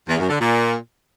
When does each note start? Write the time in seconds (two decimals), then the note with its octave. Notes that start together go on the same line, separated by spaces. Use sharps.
0.08 E2
0.18 F#2
0.29 D3
0.39 A#2